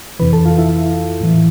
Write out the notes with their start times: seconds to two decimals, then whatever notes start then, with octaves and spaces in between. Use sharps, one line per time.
0.19 F2 C3 E3 B4 B5
0.33 A4 A5
0.45 F4 F5
0.58 E4 E5
1.21 A2 E3